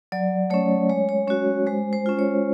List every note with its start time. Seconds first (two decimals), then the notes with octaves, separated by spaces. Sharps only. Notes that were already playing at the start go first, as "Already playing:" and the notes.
0.12 F#3 D5
0.50 A3 C#4 C#5
0.89 G#3 C#5
1.09 C#5
1.28 C#4 F#4 C#5
1.67 G#3 C5
1.93 C5
2.06 C#4 F4
2.19 C#5